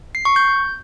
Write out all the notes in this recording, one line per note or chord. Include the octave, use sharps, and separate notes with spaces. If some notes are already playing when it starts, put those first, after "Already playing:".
C7
C#6
G6